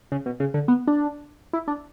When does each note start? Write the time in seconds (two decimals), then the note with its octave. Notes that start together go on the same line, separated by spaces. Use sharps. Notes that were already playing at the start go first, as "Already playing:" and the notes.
0.12 C#3
0.26 B2
0.40 C#3
0.54 D3
0.68 B3
0.87 D4
1.53 E4
1.68 D4